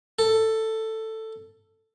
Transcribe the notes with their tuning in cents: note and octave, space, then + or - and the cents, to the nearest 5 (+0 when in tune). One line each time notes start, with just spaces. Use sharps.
A4 +10